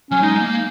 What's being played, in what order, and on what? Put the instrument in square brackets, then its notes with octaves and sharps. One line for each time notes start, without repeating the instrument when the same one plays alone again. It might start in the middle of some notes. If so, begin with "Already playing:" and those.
[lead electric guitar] F#3 [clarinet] C#4
[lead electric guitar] G#3 [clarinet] D#4
[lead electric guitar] G#3
A#3